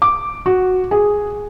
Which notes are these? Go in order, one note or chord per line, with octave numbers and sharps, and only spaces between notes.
D6
F#4
G#4